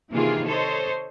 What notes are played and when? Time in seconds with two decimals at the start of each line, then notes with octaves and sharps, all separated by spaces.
0.12 C3 D#3 E3 A#3 F4 G#4
0.45 A4 C5 C#5 D#5